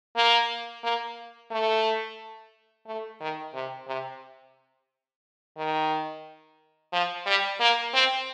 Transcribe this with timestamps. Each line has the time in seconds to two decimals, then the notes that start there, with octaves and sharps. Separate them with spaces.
0.16 A#3
0.84 A#3
1.51 A3
2.87 A3
3.20 D#3
3.54 C3
3.88 C3
5.57 D#3
6.93 F3
7.26 G3
7.60 A#3
7.94 C4